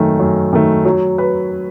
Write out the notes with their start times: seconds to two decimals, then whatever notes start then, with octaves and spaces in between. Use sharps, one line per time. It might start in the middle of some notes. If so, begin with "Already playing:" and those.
Already playing: F#2 D#3 A3
0.20 F#2
0.53 D#3 A3
0.85 F#3
1.18 B4